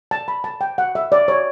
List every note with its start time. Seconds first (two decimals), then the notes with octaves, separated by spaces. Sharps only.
0.11 A5
0.28 B5
0.44 A5
0.61 G5
0.78 F#5
0.95 E5
1.12 D5
1.28 C#5